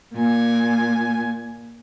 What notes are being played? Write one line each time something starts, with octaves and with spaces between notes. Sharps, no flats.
A#2 G#5